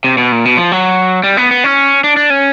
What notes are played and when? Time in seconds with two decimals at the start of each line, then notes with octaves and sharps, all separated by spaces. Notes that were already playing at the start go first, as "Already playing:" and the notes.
0.04 C3
0.18 B2
0.32 A#2
0.45 B2
0.57 F3
0.72 F#3
1.24 G3
1.37 B3
1.51 B3
1.64 C#4
2.04 D4
2.17 D4
2.30 C#4